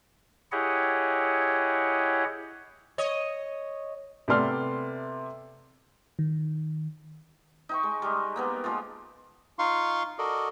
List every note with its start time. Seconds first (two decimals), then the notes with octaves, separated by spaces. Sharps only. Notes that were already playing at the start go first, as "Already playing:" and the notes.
0.52 E4 G4 G#4 C#5 D#5 F#5
2.98 C#5 D#5
4.28 C3 A3 B3 D5 C6 F6
6.19 D#3
7.69 D#4 G5 C#6
7.83 G#3
8.02 G3 G#3
8.36 A#3 B3 A#4
8.64 F3 G#3 F4
9.59 D#4 F4 F5 C6 C#6
10.18 F#4 A4 A#4 D5 D#5